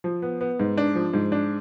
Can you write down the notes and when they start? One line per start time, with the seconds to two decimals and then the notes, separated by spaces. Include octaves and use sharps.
0.04 F3
0.22 B3
0.41 B3
0.60 G#2
0.78 D4
0.95 F3
1.14 G#2
1.32 D4